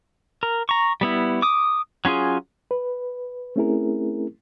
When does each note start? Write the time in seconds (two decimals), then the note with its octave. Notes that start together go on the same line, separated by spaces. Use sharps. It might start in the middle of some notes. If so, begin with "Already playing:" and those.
0.43 A#4
0.69 A#5 C#6
1.01 G3 B3 E4
1.42 D6 D#6
2.05 F#3 C#4 F4 G#4
2.71 B4
3.56 A3 C4 C#4 E4 G#4 A#4